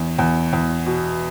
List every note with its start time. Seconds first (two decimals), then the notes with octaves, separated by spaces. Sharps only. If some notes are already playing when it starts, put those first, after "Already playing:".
Already playing: E2
0.19 E2
0.53 E2
0.86 B2